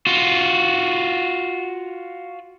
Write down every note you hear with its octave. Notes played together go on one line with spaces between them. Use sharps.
F4 F#4